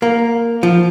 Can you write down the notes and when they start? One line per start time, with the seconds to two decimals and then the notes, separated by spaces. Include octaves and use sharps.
0.02 A#3
0.63 F3